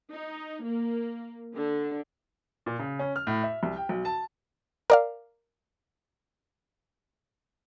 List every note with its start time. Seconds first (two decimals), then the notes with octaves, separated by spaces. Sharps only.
0.11 D#4
0.64 A#3
1.55 D3
2.66 A#2
2.79 C#3
2.99 C#4
3.16 F6
3.27 A2
3.43 E5
3.63 C2
3.76 G5
3.89 B1
4.05 A5
4.90 A#4 D5 F5